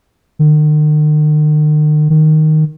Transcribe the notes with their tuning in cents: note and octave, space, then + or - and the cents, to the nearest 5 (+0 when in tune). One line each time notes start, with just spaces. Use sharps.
D#3 -45
D#3 -5